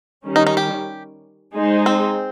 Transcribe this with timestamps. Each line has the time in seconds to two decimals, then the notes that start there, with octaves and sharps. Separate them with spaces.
0.24 D#3 G3 C#4
0.36 D#4
0.47 D#4
0.57 G4
1.54 G#3 D#4 G#4 C5
1.86 C4